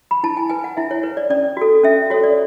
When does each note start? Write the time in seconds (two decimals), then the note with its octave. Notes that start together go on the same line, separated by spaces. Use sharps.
0.11 B5
0.23 E4 A5
0.37 G#5
0.49 B4 G#5
0.64 F#5
0.77 E4 E5
0.91 C#5
1.03 B4 C#5
1.17 D5
1.30 C#4 D5
1.57 F#4 A4
1.83 C#4 E5
2.10 F#4 C#5
2.14 A4
2.24 D5